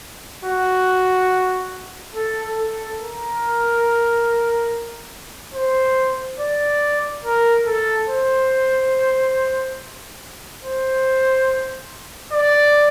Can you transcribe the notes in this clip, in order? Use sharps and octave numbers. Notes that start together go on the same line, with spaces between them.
F#4
A4
A4
A#4
C5
D5
A#4
A4
C5
C5
D5